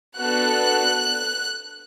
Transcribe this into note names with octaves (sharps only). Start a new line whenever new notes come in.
B3 D4 F#4 A4 F#6